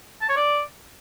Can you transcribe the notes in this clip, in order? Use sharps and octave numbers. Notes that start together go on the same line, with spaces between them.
A5
C#5
D5